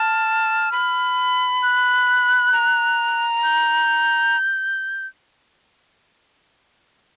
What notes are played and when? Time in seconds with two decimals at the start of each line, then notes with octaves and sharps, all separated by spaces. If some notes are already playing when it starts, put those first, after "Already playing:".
Already playing: A5 F6
0.72 B5
1.63 F#6
2.53 A#5
3.43 G6